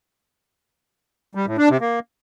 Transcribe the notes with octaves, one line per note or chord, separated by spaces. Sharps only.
G3
A2
D4
C3
A#3